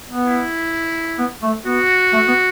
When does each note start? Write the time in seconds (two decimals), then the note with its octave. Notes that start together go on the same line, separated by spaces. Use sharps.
0.09 B3
0.25 E4
1.19 B3
1.43 A3
1.65 B3 F#4
2.13 A3
2.28 B3